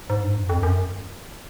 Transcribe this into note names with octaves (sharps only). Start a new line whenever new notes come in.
G#2
G2
F#2
F2
F#2